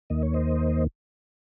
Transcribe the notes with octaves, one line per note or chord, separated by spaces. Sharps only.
D#2 D#3 A#3 D#5
C#5
C5 D#5